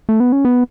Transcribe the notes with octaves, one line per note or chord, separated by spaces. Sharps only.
A3
B3
C#4
B3